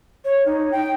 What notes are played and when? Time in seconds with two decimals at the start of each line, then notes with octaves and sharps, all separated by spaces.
0.25 C#5
0.46 D#4
0.72 G5